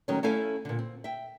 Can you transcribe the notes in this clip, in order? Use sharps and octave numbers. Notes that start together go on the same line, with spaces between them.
D#3 F#3 G#3 A3 C#4
A3 C#4 E4 A4 F5 G#5
A#2 D3
C4
E5 G5